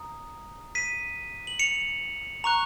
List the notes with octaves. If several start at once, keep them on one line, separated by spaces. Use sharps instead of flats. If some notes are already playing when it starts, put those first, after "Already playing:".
Already playing: A#5 D#6
B6 D#7
F#7
C#7 F7
A#5 C#6 F#6 F7